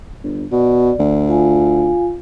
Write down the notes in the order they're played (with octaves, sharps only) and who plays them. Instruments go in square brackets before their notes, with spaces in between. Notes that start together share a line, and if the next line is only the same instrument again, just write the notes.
[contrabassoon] G1
[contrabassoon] B2 [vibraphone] D5
[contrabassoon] D2
[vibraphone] F4 F5 G#5